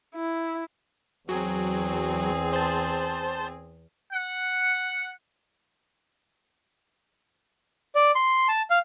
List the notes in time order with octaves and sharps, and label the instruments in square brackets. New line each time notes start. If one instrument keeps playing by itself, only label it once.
[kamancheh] E4
[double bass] E2 [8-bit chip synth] F#3 [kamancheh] C4 G#4
[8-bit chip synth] C5 A5
[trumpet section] F#5
[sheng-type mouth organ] D5
C6
A5
F5